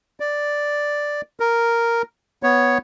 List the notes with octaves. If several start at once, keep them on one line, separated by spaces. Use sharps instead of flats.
D5
A#4
B3 C#5